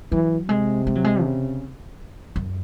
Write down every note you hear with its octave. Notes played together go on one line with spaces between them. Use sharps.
E3 F#3
C3 G#3
G#3
F#3
G#3
C#3
F#2